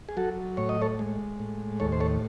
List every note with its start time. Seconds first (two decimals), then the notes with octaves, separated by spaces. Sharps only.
0.09 G#4
0.17 F#3 F#4 A4
0.57 A2 C#5
0.69 D#5
0.82 A4 C#5
0.99 G#3
1.40 A2
1.80 D#2 A4 C#5
1.92 C5
2.00 A4 C#5